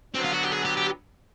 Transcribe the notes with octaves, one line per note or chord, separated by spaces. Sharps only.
D3 F#3 B3 C4
F4
F#4
G4
G#4
G4
G4